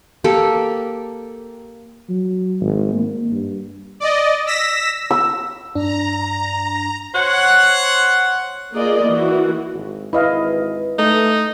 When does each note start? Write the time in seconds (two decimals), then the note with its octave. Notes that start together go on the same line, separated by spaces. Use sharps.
0.24 A#3 G4 A4
2.09 F#3
2.60 G#1
2.93 A#3
3.31 G2
4.00 D5 D#5
4.47 E6 A#6 B6 E7
5.11 E6
5.75 G2 D4 A#5
7.15 C5 C#5 F#5
8.74 A#3 F4 G#4 A#4 D5 D#5
9.07 E3 A#3 F#4
9.74 G#1
10.13 G#1 E4 B4 D#5 F5
10.98 A3 D#4